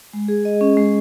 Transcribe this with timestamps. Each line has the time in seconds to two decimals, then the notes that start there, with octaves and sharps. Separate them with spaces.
0.13 G#3
0.28 G#4
0.45 D#5
0.61 C#4
0.77 G#3